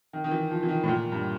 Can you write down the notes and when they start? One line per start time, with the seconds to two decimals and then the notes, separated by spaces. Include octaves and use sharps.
0.13 D#3
0.24 D#3
0.31 E3
0.51 F3
0.63 E3
0.69 D#3
0.83 A2
0.88 A#2
1.12 G2